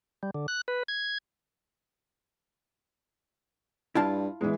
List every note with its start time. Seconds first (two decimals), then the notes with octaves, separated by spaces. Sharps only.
0.23 G3
0.35 D3
0.48 F#6
0.68 B4
0.88 G#6
3.95 G2 E4 F4 A5
4.41 E2 E3 G#3